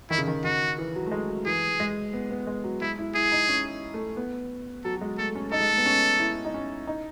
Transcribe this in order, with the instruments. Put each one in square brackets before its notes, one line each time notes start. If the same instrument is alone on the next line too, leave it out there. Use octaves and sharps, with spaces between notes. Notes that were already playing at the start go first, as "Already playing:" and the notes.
[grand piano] D#3 [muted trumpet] E4
[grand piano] C#3
D#3
[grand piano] D#3 [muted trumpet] F#4
[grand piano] E3
F#3
A3
G#3
F#3
[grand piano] E3 [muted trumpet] G#4
[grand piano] G#3
B3
B3
G#3
F#3
[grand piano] G#3 [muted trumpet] E4
[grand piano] E4
[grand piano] E4 [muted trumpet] G#4
[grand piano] D#4
C#4
A3
B3
[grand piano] F#3 [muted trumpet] A4
[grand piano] F#3
G#3
[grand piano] A3 [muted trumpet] A4
[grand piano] C#4
[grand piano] D#4 [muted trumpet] A4
[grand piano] G#3
A3
B3
C#4
E4
D#4
C#4
D#4